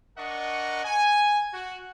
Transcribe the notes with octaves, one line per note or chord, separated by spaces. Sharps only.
D4 A#4 D#5 F#5 C#6
G#5
F#4